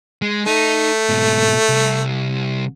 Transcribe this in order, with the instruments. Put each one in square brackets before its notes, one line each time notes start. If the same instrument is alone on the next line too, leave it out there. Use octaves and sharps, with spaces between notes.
[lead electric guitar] G#3
[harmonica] A3 [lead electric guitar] D#4
[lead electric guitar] G#2 B2
C2